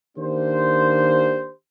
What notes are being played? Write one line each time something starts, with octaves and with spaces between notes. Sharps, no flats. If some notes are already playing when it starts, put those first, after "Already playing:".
D#3 A#3 D4 G4 C5